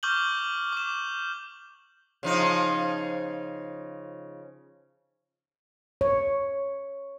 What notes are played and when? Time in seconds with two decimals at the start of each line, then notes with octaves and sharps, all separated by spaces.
0.03 C#6 D6 F6 G6 F#7 G7
0.73 D6 E7
2.23 C#3 F3 D#4
6.01 C#5